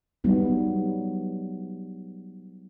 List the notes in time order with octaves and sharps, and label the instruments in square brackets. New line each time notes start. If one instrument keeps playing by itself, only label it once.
[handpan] F#3 G3 B3 D#4